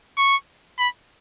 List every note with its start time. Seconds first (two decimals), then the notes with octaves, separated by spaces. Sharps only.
0.18 C#6
0.79 B5